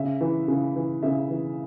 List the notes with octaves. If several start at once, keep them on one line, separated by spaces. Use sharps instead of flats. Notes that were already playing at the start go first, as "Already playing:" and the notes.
Already playing: C#3 E5
E3
C#3
E3
C#3 E5
E3